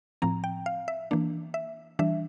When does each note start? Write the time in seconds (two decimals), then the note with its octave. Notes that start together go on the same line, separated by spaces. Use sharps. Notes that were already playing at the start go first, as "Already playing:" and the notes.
0.22 A2 F3 C4 A#5
0.44 G5
0.66 F5
0.88 E5
1.11 E3 A#3 D4
1.54 E5
1.99 E3 G3 D4 E5